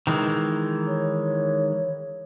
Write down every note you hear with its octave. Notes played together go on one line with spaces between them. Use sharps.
D#3 E3 G#3
C#5